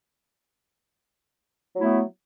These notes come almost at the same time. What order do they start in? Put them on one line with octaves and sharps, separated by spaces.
F#3 A3 E4 B3